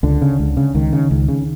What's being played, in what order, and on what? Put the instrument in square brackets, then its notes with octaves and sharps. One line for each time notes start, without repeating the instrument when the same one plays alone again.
[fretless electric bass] C#2 D3
C#3
C#2
C#3
C#2 D#3
C#3
C#2
C#3